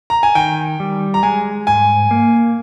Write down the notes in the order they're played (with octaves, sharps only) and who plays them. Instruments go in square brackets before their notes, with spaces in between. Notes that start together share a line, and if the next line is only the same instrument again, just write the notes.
[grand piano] A#5
G#5
[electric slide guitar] D#3 [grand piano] G5
[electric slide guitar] G3
[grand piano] A#5
[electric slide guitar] G#3 [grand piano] G#5
[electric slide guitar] G#2 [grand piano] G#5
[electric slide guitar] A#3